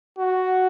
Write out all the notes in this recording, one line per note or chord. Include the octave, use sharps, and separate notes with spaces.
F#4